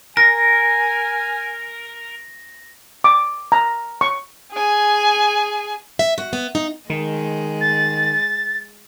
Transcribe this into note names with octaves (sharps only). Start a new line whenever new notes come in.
A#4 G#5 A#6
D6
A#5
C#6
G#4 G#5
E5
F#4
B3
D#4
D#3 G#3
A6